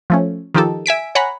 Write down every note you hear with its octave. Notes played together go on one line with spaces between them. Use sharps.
F3 A3 C#4
D#3 F3 D#4 G4 A4
E5 G#5 B6 D7
C#5 F#5 G#5 A#5 B5